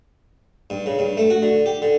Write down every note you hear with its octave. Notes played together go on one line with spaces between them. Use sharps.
G2
C#3
G2
A3
F#4
D3
G4
D3